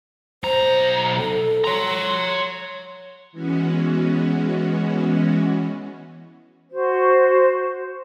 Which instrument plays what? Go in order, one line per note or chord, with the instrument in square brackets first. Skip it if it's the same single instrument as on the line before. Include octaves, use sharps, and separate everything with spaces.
[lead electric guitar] B1 A#5 [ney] C5
[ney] A4
[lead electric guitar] C#5 A#5 [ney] C6
[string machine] E3 G#3 B3 C#4 F#4
[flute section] F#4 C5